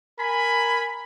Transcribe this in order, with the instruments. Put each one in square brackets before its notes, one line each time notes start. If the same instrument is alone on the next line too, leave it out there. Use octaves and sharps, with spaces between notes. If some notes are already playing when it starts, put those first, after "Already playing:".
[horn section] A#4 G#5 B5